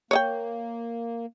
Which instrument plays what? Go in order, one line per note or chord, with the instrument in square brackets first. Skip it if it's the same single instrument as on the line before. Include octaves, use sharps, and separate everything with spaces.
[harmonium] A#3 [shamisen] C#5 D#5 G5